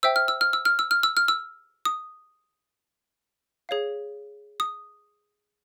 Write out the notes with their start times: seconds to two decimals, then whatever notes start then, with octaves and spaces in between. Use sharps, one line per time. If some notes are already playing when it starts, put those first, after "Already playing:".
0.03 C5 E5 G5 E6
0.16 F6
0.28 E6
0.41 F6
0.53 E6
0.65 F6
0.79 E6
0.91 F6
1.03 E6
1.17 F6
1.28 E6
1.85 D#6
3.69 G#4 C#5 F5
4.60 D#6